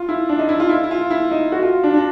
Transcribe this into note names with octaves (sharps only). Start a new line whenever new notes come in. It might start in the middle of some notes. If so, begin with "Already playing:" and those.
Already playing: F4
E4
D4
D#4
E4
F4
E4
E4
F4
E4
D#4
F#4
F4
D4
D4